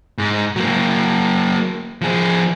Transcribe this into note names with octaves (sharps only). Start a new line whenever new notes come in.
G#2
F#3 A#3
F3 G#4